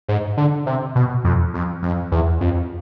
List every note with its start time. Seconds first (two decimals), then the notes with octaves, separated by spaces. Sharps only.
0.08 G#2
0.37 D3
0.66 C3
0.95 B2
1.24 F2
1.54 F2
1.83 F2
2.12 E2
2.41 F2